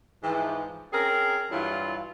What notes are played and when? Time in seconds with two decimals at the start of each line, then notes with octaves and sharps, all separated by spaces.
0.23 G#2 E3 F3
0.93 C4 C#4 G#4 A#4
1.51 G2 E3 F#3 E4 F4